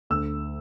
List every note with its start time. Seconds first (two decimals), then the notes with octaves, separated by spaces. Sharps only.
0.10 D2 E6